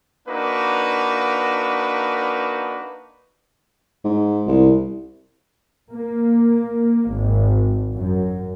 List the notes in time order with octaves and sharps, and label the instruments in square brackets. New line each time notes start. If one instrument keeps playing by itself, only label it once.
[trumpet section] A#3 D4 D#4 F#4 B4
[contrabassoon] G#2
C2
[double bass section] A#3
G#1
F#2